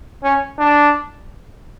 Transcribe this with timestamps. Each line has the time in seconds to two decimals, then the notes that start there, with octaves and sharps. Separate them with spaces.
0.23 C#4
0.59 D4